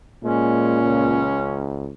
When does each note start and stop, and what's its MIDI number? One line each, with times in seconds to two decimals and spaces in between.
0.24 1.29 46
0.24 0.82 56
0.24 1.75 61
0.83 1.93 37